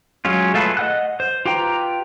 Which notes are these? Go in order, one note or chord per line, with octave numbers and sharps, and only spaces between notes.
F#3 G#3 C#4 F4
A3 F4 G#4 A4 B4
D#5 F#5 F#6
C5
F4 G4 B4 G5 A#5